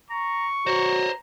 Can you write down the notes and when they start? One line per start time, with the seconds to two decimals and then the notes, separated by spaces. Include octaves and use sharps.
0.10 A#5 C#6
0.67 F#4 C5 C#5 A#5